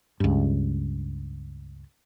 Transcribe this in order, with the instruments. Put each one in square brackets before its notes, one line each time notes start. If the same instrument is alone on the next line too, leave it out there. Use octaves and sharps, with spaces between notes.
[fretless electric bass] C#2 G2